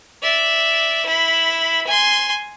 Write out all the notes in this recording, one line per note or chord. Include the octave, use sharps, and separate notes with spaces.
D5 E5
E4 B5
G#5 C6